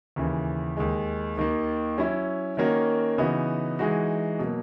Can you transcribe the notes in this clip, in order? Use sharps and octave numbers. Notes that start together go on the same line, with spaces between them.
D#2 C#3 E3
D#2 D#3 G#3
D#2 D#3 A#3
F#3 C#4 E4
D#3 A#3 C#4 F#4 A#4
C#3 E3 B3 D#4 F#4
E3 G#3 D#4 F#4
B2 F#3 A#3